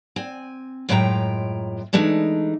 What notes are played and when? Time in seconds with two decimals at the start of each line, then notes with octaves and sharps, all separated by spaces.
0.16 C4 G#5
0.89 F#2 A2 G#3 F4 G5 A#5
1.93 E3 G#3 A3 D4 D#4